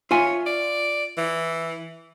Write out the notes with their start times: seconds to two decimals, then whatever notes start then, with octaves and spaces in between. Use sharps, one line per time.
0.11 F4 C#5 E5 G#5
0.46 D5
1.17 E3